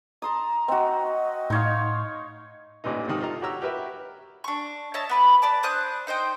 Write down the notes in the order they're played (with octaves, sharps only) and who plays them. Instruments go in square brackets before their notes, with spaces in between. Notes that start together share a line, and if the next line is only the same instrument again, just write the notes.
[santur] A5 C6 D#6 [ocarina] A#5
[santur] C4 F#4 [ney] D#5
[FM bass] A2 [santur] D#4 C#5 F5 [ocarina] C6
[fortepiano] A1 G2 A#2 E3 D#4
G#2 C3 D#3 D#6
F4 A4 D#5 A#5
F#4 G4 C#5 A#5 E6
F#4 G4 A#4 B4 E5
[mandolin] D4 C#6
C#5 D#5 E5 A5
B3 B4 D5
B4 D5 A5
D4 C5 D#6 F#6
D#4 C5 D#5 G5